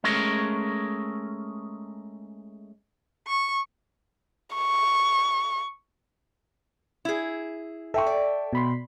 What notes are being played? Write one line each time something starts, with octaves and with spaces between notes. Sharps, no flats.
G#3 A3 C#4 G#4 A#4
C#6
C#6
E4 G#4
A4 E5 G5 C#6
D5
B2 B5 C6